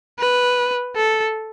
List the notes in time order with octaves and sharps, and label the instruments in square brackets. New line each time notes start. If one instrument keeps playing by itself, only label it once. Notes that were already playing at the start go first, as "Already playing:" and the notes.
[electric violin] B4
A4